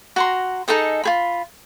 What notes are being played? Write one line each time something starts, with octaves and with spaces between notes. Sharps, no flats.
F#4 A#5 C6
D#4 G#4 A4 D#5
F4 G#4 B5